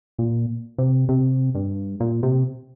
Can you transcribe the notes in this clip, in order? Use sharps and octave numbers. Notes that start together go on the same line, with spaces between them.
A#2
C3
C3
G2
A#2
C3